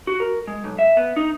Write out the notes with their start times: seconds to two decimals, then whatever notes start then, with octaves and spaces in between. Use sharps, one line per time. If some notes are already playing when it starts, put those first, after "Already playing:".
0.07 F#4
0.20 A#4
0.47 G#3
0.64 B1
0.79 E5
0.97 B3
1.16 D#4